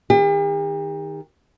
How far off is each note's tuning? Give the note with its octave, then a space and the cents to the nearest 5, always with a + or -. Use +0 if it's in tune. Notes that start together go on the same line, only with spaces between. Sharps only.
D#3 +0 G4 +45